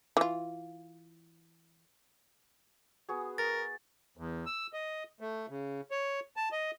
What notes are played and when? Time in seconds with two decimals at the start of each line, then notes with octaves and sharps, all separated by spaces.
0.17 E3 F4
3.09 B3 F#4 G#4
3.38 A#4 A6
4.17 E2
4.46 E6
4.73 D#5
5.20 A3
5.49 C#3
5.91 C#5
6.36 A5
6.52 D#5